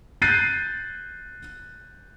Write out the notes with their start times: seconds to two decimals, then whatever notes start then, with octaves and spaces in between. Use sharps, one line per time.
0.22 F#6 G6 A6 C7 D#7